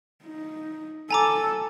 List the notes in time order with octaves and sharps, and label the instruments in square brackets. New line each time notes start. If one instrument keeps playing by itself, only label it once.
[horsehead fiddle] D#4
[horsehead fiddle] A4 [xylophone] G#5 A#5 D6